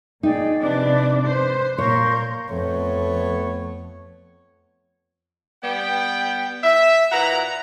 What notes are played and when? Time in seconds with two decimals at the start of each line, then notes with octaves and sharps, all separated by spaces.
0.23 A#2 D#4 G#4 D5 G5
0.61 C3 F3 D4 B4 D5 D6
1.27 B4 C5
1.78 A#2 A#4 C#5 C6 C#6 G6
2.50 F2 A3 B3 C#5
5.63 G3 B3 G5
6.64 E5
7.12 A#2 E4 B4 F#5 A#5